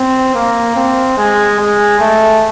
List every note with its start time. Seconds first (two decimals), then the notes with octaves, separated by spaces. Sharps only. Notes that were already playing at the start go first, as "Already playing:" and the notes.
Already playing: C4
0.35 A#3
0.76 C4
1.18 G#3
1.59 G#3
2.00 A3